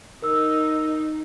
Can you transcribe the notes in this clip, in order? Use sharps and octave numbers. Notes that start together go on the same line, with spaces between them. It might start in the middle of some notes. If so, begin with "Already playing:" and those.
D#4 A#4 E6